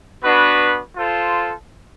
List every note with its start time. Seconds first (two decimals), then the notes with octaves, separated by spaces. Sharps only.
0.24 B3 D4 F#4 B4
0.95 F4 A4 C5